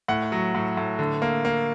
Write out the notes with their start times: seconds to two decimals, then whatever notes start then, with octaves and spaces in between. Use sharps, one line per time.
0.08 A2 F#5
0.32 F#3
0.55 A2
0.77 A2
0.99 D3
1.22 A#3
1.45 A#3